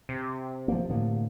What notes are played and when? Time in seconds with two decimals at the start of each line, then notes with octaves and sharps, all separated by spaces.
0.09 C3
0.68 F3 A#3
0.89 A2 D3 A#3